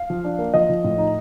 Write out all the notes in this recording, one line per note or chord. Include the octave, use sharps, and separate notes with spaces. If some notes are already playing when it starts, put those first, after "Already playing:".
Already playing: F5
F3
D4
A#3
F3 D#5
F3
A2
D#4